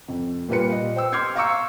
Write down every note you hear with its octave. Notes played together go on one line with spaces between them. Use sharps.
F2
A#2 G3 F4 B4 C#7
D#5
C5 G5 E6
C6 D6 F6 G6 G#6 C7
F5 A#5 C#6 D6 E6 C#7